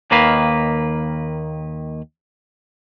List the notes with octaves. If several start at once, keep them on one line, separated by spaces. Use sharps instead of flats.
D#2 D#3 A#3 B4 F5